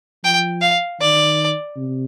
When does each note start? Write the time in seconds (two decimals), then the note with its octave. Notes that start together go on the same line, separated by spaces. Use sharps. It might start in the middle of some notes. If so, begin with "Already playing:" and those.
0.24 F3 G5
0.61 F5
1.00 D#3 D5
1.76 C3